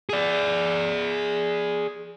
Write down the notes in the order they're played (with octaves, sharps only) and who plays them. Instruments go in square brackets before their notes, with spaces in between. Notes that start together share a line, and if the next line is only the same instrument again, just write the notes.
[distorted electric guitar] G#4 D5